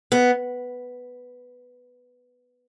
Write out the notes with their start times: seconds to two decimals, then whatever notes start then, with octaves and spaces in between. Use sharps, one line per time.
0.12 B3